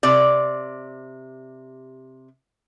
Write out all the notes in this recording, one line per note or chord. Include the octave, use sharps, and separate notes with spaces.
C3 D5